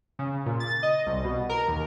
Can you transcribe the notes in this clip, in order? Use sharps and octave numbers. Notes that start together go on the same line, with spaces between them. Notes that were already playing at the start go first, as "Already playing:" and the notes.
C#3
A#2
A6
D#5
C2
B2
A#4
D#2